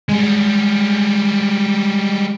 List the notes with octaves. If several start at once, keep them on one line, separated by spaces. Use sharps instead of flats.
G3 G#3